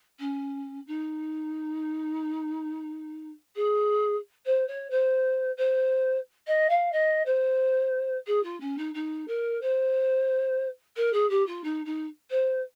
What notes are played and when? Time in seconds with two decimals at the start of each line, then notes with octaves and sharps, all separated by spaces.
0.19 C#4
0.87 D#4
3.55 G#4
4.45 C5
4.67 C#5
4.90 C5
5.57 C5
6.47 D#5
6.69 F5
6.92 D#5
7.25 C5
8.26 G#4
8.43 F4
8.60 C#4
8.77 D#4
8.94 D#4
9.27 A#4
9.61 C5
10.96 A#4
11.13 G#4
11.29 G4
11.46 F4
11.63 D#4
11.85 D#4
12.30 C5